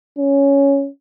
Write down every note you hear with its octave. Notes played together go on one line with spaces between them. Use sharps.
C#4